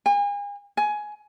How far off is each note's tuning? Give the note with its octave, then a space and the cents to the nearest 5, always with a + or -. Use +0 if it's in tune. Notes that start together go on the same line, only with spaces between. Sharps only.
G#5 -40
G#5 +15